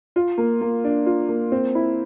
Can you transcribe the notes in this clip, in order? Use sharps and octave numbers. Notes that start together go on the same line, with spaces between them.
F4
A#3
A#3
D4
F4
A#3
C4
E4